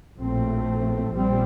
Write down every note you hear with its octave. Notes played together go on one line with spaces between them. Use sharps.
A#1 A2 A3 C4
A#1 A#2 G3 C4